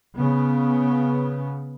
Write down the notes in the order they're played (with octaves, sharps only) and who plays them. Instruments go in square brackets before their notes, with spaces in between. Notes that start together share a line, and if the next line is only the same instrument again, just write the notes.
[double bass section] C#3 B3